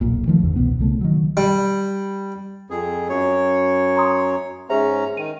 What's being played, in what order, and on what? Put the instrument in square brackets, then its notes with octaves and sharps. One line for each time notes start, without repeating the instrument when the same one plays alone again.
[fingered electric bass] E1 B1 A#2
D#3 F3 G#3 A3
G1 E2 D3
C2 B2 B3
C2 C#3 A3 B3
D#3 F#3
[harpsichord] G3
[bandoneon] F2 G#4
F#2 C#5
[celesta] A#5 C6 D#6
[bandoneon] G#2 C#4 A#5 [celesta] G#4 C5 E5
[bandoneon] D#3 [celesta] D#7